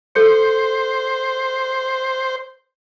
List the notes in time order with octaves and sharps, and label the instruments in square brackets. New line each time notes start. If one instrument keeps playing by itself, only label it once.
[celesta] A4 G6 C#7 [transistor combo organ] C5